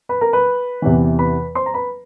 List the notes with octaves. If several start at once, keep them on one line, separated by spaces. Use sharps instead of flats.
B4 B5
A#4 A#5
B4 B5
E2 C3 E3
B4 B5
C5 C6
A#5
B4 B5